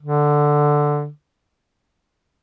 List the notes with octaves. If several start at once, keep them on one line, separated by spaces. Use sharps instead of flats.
D3